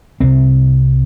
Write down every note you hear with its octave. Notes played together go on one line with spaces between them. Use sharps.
C2 C3 C4